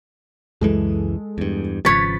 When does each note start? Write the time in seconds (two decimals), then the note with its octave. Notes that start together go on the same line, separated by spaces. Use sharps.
0.61 C#2 F#2 E3 G#3 A4
1.38 E2 G2
1.85 G#1 C#3 F3 B4 C#5 A6 B6